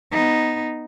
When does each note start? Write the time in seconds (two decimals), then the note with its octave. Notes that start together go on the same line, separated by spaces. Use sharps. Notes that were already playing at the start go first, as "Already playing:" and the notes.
0.11 B3 D#4